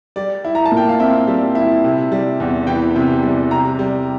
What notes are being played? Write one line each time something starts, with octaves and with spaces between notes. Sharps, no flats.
G3 D5
E4
A#5
A5
A#2
G5
F5
C4 E5
G3
E4
C3
G3
E2
E3 G5
C3
G3
C3 A#5
G3